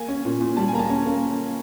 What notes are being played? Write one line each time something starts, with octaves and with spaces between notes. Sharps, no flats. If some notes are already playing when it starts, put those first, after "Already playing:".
Already playing: A#3 G#5
C#4
A#2
A#2
G3 A5
G#5
A#3 A#5
A5
C#4
A#3